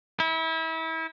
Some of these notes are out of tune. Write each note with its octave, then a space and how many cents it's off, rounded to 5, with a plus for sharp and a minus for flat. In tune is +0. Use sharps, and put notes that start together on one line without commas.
E4 -30